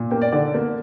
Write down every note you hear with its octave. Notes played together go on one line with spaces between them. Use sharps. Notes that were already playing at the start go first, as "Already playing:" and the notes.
Already playing: A#2
A#3 G5
D5
D3 D5
A#3